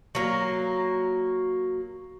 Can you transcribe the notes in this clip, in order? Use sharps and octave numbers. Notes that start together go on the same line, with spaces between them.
F#3 A#3